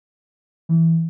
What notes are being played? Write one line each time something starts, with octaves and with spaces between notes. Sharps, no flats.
E3